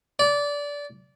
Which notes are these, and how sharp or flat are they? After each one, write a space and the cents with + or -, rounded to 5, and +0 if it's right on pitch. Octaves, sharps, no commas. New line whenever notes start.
D5 -20